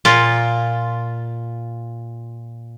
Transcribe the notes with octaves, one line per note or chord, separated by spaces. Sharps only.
A#2 F4